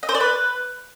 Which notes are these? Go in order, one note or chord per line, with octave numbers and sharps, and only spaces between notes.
D#5
C5
D5
B4